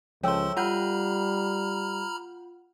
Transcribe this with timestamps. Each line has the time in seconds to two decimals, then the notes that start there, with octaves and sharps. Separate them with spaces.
0.23 C#2 F3 A4 C#5 E5 G5 C6 E6
0.57 G3 F4 F#5 A#5 B5 F6 G6